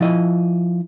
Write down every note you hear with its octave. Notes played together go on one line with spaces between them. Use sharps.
F3 E4 D#5